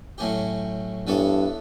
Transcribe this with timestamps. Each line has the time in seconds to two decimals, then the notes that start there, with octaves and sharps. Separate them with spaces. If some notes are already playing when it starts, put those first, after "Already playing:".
0.18 A2 F#3 A3 C#4 G4
1.07 G2 E3 B3 D4 A4 C#5